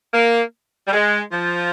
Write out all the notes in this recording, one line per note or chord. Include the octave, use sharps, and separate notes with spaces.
A#3
G3
G#3
F3